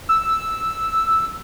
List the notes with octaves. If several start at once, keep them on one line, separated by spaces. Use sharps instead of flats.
E6